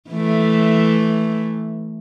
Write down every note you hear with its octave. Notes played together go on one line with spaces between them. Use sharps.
E3 A3